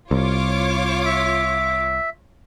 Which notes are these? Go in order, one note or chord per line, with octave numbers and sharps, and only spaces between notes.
C2 F4 C#5 D6
E5